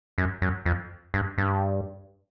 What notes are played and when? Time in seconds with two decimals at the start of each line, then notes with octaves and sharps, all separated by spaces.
0.18 F#2
0.42 F#2
0.66 F2
1.14 G2
1.38 G2